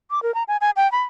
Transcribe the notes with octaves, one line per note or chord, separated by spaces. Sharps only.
D6
A#4
A#5
G#5
G#5
G5
B5